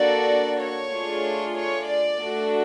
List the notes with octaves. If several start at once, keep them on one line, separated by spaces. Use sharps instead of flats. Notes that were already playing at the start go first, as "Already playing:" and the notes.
Already playing: A#3 D4 F#4 A4 D5
C#5
A3 D4 F4 G#4
C#5
D5
A3 D4 F#4 A4